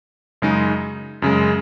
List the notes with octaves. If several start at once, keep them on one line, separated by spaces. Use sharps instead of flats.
F#2 C#3 G#3 D#4
F#2 C#3 G#3